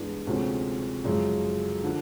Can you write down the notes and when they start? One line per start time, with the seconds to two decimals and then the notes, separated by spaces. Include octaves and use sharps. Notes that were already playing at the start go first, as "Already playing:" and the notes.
Already playing: G2 E3 G#3 B3 D4
0.27 D2 C3 F3 G#3 C#4
1.04 F#2 C#3 F3 G#3 C#4
1.84 D3 F3